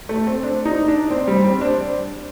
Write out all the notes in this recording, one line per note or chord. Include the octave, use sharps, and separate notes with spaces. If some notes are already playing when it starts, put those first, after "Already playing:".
A3
C4
D4
D#4
D4
C4
G3
C4
D4